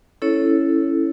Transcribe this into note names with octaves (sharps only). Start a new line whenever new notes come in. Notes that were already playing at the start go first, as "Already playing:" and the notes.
C#4 E4 A4 C#5